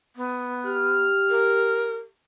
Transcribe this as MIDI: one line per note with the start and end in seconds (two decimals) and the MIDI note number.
0.16 1.05 59
0.66 2.09 67
0.66 1.94 89
1.30 1.95 70